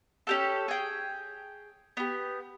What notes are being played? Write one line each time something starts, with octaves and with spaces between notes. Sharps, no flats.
C#4 G4 A4
G#4 G5
B3 G4